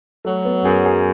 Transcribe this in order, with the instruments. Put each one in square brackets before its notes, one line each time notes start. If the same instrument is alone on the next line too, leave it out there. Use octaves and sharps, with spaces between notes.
[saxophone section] F#3 [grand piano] A3
[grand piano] B3
[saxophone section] F#2 [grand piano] G#4
[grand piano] G#4